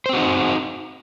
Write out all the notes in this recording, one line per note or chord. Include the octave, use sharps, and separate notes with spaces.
C4 D#4 F#4 C5